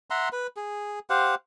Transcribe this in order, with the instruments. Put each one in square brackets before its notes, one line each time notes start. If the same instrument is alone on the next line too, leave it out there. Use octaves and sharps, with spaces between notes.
[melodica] E5 F#5 A#5 C6
B4
G#4
G4 C5 F5 F#5